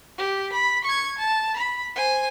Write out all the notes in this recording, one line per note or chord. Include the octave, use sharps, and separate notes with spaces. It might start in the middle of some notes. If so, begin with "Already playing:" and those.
G4
B5
C#6 G#6
A5
B5
C5 G#5